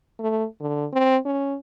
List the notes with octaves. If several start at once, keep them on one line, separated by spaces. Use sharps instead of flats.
A3
D3
C4
C#4